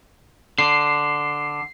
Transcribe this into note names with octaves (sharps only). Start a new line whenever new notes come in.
D3 C7